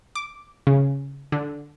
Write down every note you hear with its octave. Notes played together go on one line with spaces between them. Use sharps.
D6
C#3
D3